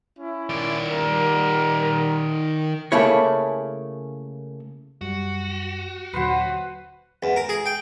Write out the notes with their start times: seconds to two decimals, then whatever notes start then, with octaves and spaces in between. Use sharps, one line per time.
0.18 C#4 E4
0.49 D#3 D5
0.91 G3 A#4
2.92 C#3 A3 A#3 E4 C#5
5.01 F#2 G3 F#4
6.13 D#2 A#2 D3 F#3 B4 C5 F#5
7.23 E2
7.36 A#4
7.49 G#4
7.66 G5